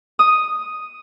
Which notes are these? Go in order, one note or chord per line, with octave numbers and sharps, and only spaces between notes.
D#6